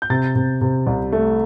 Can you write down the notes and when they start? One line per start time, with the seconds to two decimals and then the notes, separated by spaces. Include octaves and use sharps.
0.02 G6
0.10 C3 A6
0.35 C3
0.61 C3
0.87 C2
1.12 A3